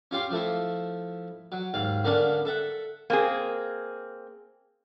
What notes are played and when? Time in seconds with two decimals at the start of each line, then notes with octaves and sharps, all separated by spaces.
0.11 C#4 F4 G4 C6
0.31 F3 A3 E4
1.52 F#3
1.74 D#2 G#2 F5
2.04 D3 A#3 B3 C#4 D4
2.45 A4 E5 F#5
3.10 A#3 C4 G#4